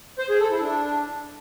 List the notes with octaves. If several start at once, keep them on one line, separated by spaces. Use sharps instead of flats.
C5
G#4
A4
E4
D4